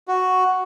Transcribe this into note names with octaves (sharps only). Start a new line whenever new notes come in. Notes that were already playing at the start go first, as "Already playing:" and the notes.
F#4